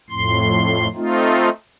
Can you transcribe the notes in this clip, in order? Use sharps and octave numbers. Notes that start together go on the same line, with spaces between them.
F2 A2 C6
A3 C4 D#4 F4